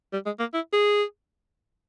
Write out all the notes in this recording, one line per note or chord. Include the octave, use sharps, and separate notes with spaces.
G3
G#3
A#3
E4
G#4